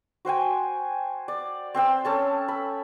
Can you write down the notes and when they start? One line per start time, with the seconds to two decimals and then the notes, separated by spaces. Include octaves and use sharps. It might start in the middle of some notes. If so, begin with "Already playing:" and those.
0.25 F#4 C5 G5 G#5
1.28 D5
1.74 C4 C5 G5 E6
2.05 C#4 A4 A5
2.48 B5